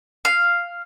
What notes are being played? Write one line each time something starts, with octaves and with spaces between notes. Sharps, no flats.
F5